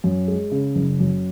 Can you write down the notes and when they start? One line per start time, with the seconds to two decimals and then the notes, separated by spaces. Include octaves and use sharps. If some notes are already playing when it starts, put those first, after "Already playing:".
0.04 F#2
0.28 G#3
0.51 C#3
0.76 F#1
1.00 F#2